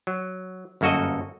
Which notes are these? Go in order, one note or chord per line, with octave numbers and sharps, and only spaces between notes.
F#3
G1 F#2 A#3 F#4 A4 D#5